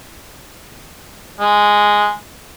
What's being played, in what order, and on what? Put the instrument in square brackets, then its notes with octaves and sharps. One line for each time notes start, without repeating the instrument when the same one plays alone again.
[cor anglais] G#3